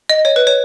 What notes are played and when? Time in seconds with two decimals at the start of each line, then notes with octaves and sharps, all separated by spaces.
0.09 D#5
0.25 C#5
0.36 B4
0.47 C#5